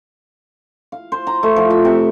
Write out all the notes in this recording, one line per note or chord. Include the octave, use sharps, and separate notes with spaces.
F5
C5
A#5
A3
F3
E5
C3